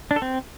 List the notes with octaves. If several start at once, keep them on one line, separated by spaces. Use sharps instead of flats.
D4
A4
C4